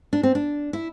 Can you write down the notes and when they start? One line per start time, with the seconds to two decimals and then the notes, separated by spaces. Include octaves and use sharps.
0.13 D4
0.23 C4
0.35 D4
0.73 E4